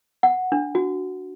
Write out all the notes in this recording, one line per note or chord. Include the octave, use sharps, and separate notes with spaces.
F#5
D4
F#4